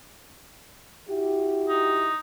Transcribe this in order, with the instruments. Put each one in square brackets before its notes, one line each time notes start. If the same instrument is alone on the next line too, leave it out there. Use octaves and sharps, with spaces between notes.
[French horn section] E4 F#4 G4
[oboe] D#4